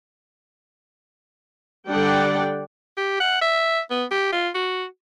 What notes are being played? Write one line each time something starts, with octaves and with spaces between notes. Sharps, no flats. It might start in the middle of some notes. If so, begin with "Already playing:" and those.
D3 G3 D4 D5 F#5 G5
G4
F#5
E5
B3
G4
F4
F#4